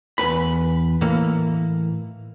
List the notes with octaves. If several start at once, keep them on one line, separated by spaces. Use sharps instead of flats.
E2 G#2 B4 B5
A2 E3 A#3